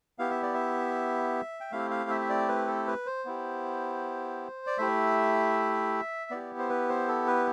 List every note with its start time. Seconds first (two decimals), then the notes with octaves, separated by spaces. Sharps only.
0.19 B3 E4 G4 F5
0.30 E5
0.43 D5
0.54 E5
1.60 G5
1.71 A3 C4 E4 G4 F5
1.91 F5
2.10 E5
2.21 E5
2.29 D5
2.48 B4
2.67 A4
2.87 B4
3.06 C5
3.25 B3 E4 G4
4.67 D5
4.78 A3 E4 G4 E5
6.31 B3 E4 G4 D5
6.58 C5
6.70 B4
6.89 C5
7.08 A4
7.27 B4